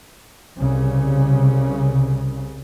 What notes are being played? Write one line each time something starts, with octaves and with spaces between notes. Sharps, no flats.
C2 C#3